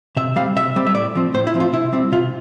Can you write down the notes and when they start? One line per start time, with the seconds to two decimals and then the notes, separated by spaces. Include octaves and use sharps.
0.17 C3 E5
0.36 G3 C4 F5
0.56 C3 E5
0.76 G3 C4
0.87 E5
0.95 A2 D5
1.15 F3 C4
1.34 A2 C5
1.47 E4
1.54 F3 C4
1.60 F4
1.73 C3 E4
1.92 G3 C4
2.12 C3 F4